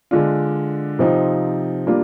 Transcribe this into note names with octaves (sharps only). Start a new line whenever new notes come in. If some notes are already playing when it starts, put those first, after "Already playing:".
D3 G#3 D4 F4
C3 F3 C4 D#4
G3 A#3 D4 F4